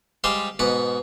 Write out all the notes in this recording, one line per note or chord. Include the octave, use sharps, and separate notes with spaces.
G3 G#3 G4 C5 F5
G#2 B2 F#5 D6